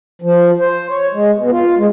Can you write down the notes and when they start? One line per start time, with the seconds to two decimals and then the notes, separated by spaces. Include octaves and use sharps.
0.22 F3
0.59 C5
0.90 C#5
1.13 G#3
1.38 B2
1.51 F4
1.78 G#3